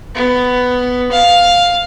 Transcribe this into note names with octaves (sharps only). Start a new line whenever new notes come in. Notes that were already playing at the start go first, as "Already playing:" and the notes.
B3
F5